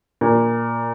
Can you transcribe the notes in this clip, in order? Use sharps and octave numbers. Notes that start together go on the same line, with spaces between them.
A#2